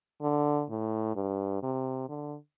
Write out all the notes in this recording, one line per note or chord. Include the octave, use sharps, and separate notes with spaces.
D3
A2
G2
C3
D3